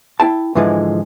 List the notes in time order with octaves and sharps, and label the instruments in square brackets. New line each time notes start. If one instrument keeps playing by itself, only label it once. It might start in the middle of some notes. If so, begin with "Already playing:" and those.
[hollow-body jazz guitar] E4 G5 A5
G#2 D3 E3 F3 G#3